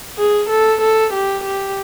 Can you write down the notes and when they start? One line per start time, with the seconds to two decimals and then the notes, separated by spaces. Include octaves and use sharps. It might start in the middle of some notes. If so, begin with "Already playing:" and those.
0.18 G#4
0.49 A4
0.81 A4
1.13 G4
1.44 G4